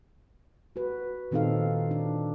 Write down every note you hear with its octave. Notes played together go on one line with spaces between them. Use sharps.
F#4 B4
A#2 D#3 C4 D#4 A4 F5
D4